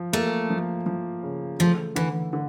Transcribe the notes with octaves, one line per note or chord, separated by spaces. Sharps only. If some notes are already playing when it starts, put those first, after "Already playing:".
Already playing: F3
A3 A#3
F3
F3
C#3
F3 A3
D3 E3
D3